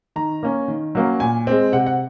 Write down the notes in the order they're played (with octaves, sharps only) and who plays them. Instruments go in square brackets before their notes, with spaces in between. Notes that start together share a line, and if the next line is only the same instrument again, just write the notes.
[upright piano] D#3 A#5
A#3 C#4
D#3
F#3 A#3 C#4
A#2 G#5
G#3 C4
C3 F#5
F#5